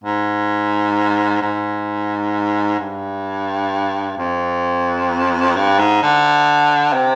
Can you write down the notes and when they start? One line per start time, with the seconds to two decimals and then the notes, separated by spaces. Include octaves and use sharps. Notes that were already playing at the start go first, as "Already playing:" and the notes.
0.04 G#2
1.42 G#2
2.79 G2
4.18 F2
5.56 G2
5.79 G#2
6.03 D3
6.94 C3